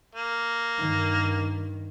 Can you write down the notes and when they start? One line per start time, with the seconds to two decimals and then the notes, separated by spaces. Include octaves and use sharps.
0.15 A#3
0.79 G2 D#3